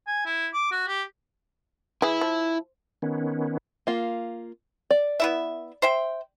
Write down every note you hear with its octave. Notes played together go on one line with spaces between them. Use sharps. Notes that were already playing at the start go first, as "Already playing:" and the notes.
G#5
E4
D6
F#4
G4
E3 E4 G#4
F3
D#3 B3 C#4
A#3 F4
D5
B3 E4 E5
C5 E5 G5